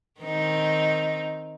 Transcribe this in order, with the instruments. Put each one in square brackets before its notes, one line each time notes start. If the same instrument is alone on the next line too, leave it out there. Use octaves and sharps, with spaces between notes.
[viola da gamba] D#3 C4 D#4